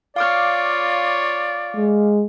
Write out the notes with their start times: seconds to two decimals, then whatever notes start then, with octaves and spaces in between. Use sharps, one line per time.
0.16 F4 C#5 D5 F5 D6 F6
1.76 G#3